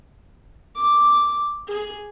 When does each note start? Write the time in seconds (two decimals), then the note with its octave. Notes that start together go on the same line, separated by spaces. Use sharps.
0.76 D6
1.68 G#4